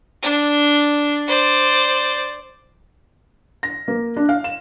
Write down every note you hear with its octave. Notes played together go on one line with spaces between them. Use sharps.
D4
C5 D5
A#6
A#3
D4
F5
E7